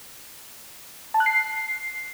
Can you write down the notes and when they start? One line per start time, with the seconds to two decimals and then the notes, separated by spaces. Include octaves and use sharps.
1.14 A5
1.20 F#6
1.26 C7